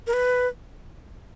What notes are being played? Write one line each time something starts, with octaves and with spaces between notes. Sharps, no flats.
A#4
B4